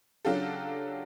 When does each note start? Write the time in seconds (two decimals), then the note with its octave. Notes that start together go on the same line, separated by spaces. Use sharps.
0.25 C#3 F#3 D4 F4 G4 A4